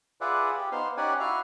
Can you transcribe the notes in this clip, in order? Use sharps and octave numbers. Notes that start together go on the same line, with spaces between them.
F4 G#4 B4 D5 E5 F#5
G4
B3 D#4 C5 F5
C#4 D#4 G4 D5 F#5 G#5
E4 F#4 E5 F5 F6